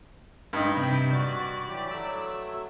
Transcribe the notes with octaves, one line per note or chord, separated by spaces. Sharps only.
G2 D#4 B5
C3 G5
F#4 D5
E3 F#3 G4
F#3 A3 E6